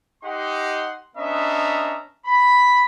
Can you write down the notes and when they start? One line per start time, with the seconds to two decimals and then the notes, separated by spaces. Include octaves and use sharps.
0.23 D#4 G4 D#5 F#5 C6
1.16 B3 C#4 D4 D#5 E5 A#5
2.26 B5